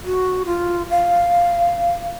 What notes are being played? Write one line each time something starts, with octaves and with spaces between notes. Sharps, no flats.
F#4
F4
F5